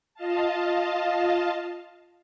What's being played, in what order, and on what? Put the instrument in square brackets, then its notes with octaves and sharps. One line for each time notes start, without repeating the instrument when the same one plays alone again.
[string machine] F4 D#5 F5 A5